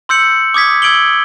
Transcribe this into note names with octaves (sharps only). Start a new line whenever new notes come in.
C6 E6 G6 C#7 F#7
D6 D#6 G#6 B6
E6 G#6 D7 F#7 G7